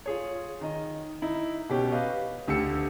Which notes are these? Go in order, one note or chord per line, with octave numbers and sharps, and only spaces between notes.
F4 G#4 C#5
D#3 D#5
D#4 E4
B2 C#4 G4
B4 D#5 F5
D2 D3 G4 G5 E6 C#7